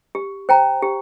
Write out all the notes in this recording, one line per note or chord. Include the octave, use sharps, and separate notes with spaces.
G4
C5 G5 A#5
G4